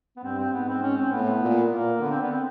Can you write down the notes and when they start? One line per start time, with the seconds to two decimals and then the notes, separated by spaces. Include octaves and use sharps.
0.17 B3
0.23 G2 C4
0.38 C4
0.53 G#2 B3
0.68 C4
0.82 C#4
0.97 C4
1.11 A2 B3
1.42 A#2
1.70 A#2 A#3
2.00 D3 B3
2.10 C4
2.21 B3
2.31 C4